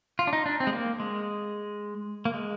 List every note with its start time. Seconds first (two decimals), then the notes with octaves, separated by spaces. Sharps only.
0.19 F4
0.27 D4
0.33 D#4
0.46 D4
0.60 C4
0.67 G#3
0.73 A#3
1.00 G#3
2.25 A#3
2.34 G#3